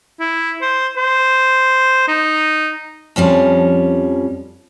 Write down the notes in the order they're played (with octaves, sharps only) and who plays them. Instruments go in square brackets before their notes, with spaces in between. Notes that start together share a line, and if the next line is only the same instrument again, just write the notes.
[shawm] E4
C5
C5
D#4
[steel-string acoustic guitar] F2 F3 G3 C#4